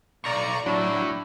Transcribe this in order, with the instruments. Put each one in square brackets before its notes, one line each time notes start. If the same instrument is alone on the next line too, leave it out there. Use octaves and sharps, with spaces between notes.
[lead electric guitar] B1 [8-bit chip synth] D5 A#5 C#6
[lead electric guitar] A2 [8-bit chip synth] F#3 [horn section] D4 [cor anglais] E4